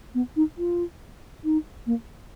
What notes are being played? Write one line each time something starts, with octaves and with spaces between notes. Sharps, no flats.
B3
D#4
F4
D#4
A#3